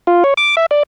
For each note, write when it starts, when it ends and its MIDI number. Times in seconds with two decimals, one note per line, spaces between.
0.07 0.23 65
0.24 0.34 73
0.37 0.55 86
0.57 0.66 76
0.71 0.83 74